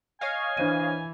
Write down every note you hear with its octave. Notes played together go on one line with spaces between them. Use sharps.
C#5 D#5 F5 G#5
E3 D4 C5 D#7